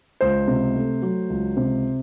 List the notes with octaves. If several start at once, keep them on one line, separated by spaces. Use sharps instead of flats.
C#2 C5
C3
A3
F#3
C#2
C3